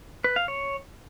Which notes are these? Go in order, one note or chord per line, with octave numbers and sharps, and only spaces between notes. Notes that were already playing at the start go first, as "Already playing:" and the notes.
B4
F5
C#5